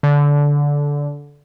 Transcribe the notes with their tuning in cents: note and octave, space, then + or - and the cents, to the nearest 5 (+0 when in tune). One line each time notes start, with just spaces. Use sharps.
D3 -20